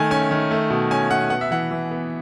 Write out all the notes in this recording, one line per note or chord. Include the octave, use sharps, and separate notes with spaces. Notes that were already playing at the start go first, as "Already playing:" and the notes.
Already playing: D#3 A3 G#5
C#4 G#5
D#3
A3
B2
C#4 G#5
B2 F#5
B3 F#5
E5
E3 F#5
E3
B3